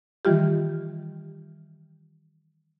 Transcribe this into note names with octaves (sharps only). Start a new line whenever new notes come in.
D#3 E3 G3 F4 G4